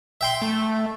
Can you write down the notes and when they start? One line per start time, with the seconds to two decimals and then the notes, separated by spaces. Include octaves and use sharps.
0.21 E5 G5 C6
0.42 A3